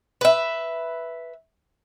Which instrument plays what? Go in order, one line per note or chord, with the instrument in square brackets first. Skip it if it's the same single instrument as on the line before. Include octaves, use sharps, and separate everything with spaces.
[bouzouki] B4 E5